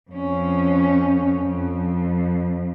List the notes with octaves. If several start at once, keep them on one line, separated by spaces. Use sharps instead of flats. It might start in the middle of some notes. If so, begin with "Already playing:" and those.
F2 C#4
F2